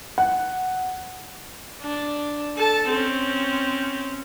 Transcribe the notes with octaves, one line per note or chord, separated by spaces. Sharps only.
F#5
D4
A4 A5
C4 C#4